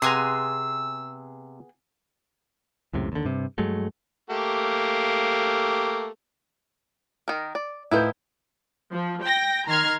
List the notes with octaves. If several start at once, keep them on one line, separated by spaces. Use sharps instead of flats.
C3 B3 G#4 G#5 A#5 C6 E6
C#2 F#2 A2 C3
D#2 D3
G2 C3
G2 F#3 G#3 A3
A3 A#3 G4
D#3 A#4
D5
A2 D#3 F3 E4 B4 G6
F3
G5 A#6
D#3 A#5 C6 F6 G#6